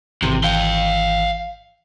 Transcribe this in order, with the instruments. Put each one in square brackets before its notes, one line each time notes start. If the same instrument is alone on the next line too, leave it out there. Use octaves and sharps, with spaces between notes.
[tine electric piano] G#1 E3 [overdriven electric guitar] C3
[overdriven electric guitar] F5 G5